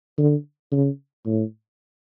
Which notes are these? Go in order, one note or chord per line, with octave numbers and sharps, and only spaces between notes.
D3
C#3
A2